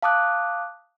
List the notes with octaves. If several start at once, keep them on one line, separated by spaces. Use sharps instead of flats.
F5 A5 D6 D#6 F#6